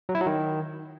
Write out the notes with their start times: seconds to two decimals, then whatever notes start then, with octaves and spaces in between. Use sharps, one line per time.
0.09 F#3
0.15 E4
0.21 F#3
0.26 D#3